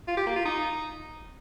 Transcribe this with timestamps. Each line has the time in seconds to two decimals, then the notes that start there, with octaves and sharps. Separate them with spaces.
0.07 F4
0.17 G4
0.26 A#3
0.36 F4
0.45 D#4